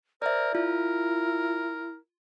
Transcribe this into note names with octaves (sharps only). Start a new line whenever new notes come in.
A#4 C5 D5 E5
E4 F4 A#4